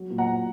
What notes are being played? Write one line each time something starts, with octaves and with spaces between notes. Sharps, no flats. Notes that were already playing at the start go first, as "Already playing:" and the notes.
Already playing: F#3
A#2
F#5 A#5
A#2